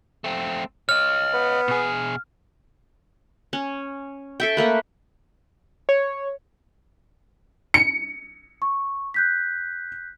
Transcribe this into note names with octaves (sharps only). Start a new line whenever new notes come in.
A3 C4
C#5 D#5 F6
B3
B2 G#4
C#4
A4 E5 G5
A3 A#3 B4
C#5
C#7
C#6
F#6 G6 B6